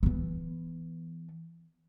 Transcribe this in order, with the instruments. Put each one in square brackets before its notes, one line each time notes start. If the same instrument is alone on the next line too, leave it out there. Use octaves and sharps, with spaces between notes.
[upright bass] E3 B3